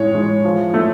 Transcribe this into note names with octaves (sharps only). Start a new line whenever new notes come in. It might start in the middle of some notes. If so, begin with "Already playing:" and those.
Already playing: A2 G#3 C#5
G#3
F3
A3